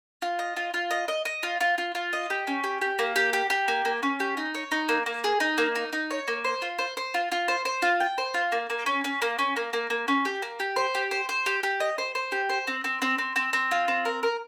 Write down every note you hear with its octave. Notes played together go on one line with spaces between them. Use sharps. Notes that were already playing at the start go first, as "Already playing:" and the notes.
F4
D#5
F4
F4
D#5
D#5
D#5
F4
F4
F4
F4
D#5
G4
C#4
G4
G4
A#3
G4
G4
G4
A#3
A#3
C#4
G4
D#4
C#5
D#4
A#3
A#3
G#4
D#4
A#3
D#4
D#4
C#5
A#3
C5
F4
C5
C5
F4
F4
C5
C5
F4
G5
C5
F4
A#3
A#3
C#4
C#4
A#3
C#4
A#3
A#3
A#3
C#4
G4
A#3
G4
C5
G4
C5
C5
G4
G4
D#5
C5
C5
G4
C5
C4
C4
C4
C4
C4
C4
F4
C4
A#4
A#4